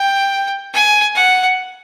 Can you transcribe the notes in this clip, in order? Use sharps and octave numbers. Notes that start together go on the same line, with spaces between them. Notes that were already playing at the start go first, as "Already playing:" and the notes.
Already playing: G5
G#5
F#5